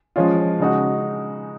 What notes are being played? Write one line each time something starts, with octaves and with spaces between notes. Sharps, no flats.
F3 G#3 C#4 F4
C#3 G#3 D#4 F#4